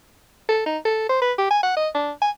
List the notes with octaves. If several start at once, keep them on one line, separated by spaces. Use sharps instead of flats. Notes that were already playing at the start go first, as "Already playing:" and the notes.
A4
D#4
A4
C5
B4
G4
G#5
F#5
D#5
D4
G#5